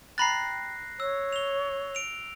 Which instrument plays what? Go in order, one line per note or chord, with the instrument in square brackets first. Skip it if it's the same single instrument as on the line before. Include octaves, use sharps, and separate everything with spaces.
[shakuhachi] G5 [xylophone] A#5 B5 A6 [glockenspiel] F#6 A#6 C7
[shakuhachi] C#5 [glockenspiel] E6
[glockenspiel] F7 G7
D7 F7